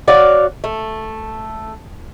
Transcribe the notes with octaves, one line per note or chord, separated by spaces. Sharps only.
F#4 C#5 D5 F5
A3